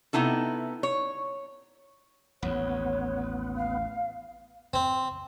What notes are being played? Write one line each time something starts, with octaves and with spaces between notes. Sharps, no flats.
C3 B3 D#4 E4 A4
C#5
A1 D#2 B3 C#5
F5
C4